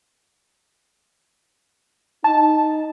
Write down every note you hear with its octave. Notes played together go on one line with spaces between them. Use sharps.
D#4 A5